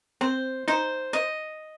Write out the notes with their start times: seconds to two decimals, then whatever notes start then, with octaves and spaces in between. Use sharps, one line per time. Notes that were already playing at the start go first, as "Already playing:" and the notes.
0.21 C4 C5
0.68 D#4 C5
1.13 D#5